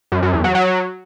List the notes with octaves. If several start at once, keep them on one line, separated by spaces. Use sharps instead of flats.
F#2
F#2
E2
F#3
F#3